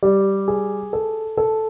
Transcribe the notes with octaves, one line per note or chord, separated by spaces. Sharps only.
G3
G#4
A4
A4